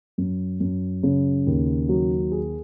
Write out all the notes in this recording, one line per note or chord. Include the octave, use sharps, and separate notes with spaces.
F#2
F#2
C#3
D#2
F#3
G#4